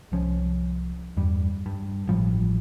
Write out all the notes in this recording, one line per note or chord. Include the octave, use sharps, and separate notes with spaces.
C2 F3 C#4
E2 G2 G3
G2
A1 F3 G3